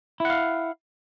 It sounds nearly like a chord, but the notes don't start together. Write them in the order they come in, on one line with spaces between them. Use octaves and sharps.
E4 F#5 F5